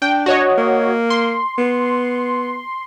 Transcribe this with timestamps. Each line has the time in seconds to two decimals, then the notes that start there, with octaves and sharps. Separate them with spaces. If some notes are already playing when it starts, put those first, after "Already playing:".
0.02 D4 G5
0.26 F#4 C#5 D#5
0.58 A#3
1.10 C6
1.58 B3